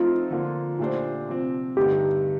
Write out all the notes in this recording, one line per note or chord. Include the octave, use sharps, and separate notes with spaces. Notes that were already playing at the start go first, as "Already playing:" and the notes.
Already playing: F3 A3 C4 D#4 F4
D3 F3 A#3 F4
A#2 A3 D4 G4 C5
C3 F3 C4
G2 D3 A3 D#4 G4